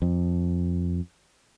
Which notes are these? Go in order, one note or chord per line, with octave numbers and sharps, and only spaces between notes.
F2